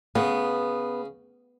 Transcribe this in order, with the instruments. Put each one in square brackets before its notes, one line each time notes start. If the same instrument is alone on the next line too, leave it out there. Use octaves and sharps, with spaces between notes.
[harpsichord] C#3 [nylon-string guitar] B3